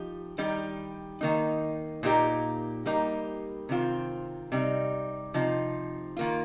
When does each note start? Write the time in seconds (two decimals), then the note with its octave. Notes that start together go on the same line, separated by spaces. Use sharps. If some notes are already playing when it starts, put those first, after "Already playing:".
Already playing: F3 D#4 G4
0.38 D#3 G3 D#4 G4
1.21 D#3 A#3 D#4
2.03 A#2 A#3 D#4 G4
2.86 G3 A#3 D#4 G4
3.69 C3 D#3 C4 F4
4.52 C3 G3 D#4
5.34 C3 F3 D#4
6.17 D#3 A#3 F4